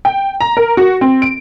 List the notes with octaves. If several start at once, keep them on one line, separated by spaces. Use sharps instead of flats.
G5
A#5
A#4
F#4
C4
D7